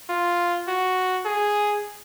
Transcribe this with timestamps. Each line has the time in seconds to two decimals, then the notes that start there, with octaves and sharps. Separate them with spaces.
0.10 F4
0.68 F#4
1.25 G#4